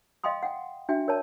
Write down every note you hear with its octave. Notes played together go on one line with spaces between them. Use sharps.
D#5 F5 G5 C6 D#6
F#5 G5
D4 F#4 E5 G5
A#4 C#5 D5 A5